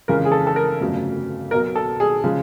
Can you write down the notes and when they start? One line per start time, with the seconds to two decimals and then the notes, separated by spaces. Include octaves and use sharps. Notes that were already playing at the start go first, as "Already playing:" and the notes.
0.08 F2 C#3 E3 G#3 A#4
0.25 G#4
0.32 A4
0.47 A4
0.56 A#4
0.80 G1 F2 C#3 F#3 A3
1.51 B1 B2 F#3 A#4
1.76 A4
2.00 G#4
2.24 C#3 F3 G#3